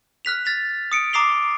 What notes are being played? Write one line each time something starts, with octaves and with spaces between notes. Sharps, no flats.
F6 F#6 B6 F7
F6 A6 B6 F7
D#6 C#7 D7
A#5 D6 D#6 C7 F7 G7